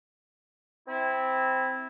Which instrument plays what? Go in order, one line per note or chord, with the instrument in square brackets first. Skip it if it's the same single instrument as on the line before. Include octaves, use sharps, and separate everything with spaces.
[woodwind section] C4 E4